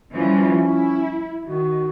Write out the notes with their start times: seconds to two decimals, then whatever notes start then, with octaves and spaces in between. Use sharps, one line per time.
0.13 E3 F3 G3 C#4
0.63 E4
1.46 D#3 F#4